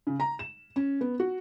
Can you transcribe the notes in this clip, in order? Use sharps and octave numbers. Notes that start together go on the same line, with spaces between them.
C#3
A#5
E7
C#4
B3
F#4